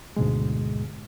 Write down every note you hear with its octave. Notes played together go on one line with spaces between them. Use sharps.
D2 G#2 B2 G#3